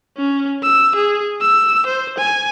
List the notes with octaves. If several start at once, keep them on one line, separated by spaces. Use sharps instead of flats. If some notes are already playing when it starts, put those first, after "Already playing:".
C#4
E6
G#4
E6
C5
G#5